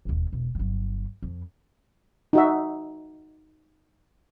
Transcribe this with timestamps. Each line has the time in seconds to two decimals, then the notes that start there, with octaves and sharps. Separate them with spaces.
0.05 E1 D#2
0.32 E1
0.55 G1 F#3
1.22 F2
2.33 D#4 F#4 E5